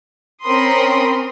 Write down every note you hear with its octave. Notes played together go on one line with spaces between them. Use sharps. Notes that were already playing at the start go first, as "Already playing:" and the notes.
C4 C#4 A#4 B5 C6 D#6